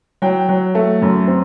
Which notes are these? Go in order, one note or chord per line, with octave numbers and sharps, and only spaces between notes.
F#3 G5
F#3
A3
F#2
C4